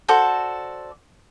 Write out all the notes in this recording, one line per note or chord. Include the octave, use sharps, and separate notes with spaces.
F#4 A4 C5 D5